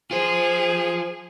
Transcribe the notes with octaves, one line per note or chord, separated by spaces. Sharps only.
F4 G#4 C5